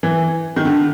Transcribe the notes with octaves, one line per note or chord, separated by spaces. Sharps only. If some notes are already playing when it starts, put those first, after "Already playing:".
E3
D#3
D3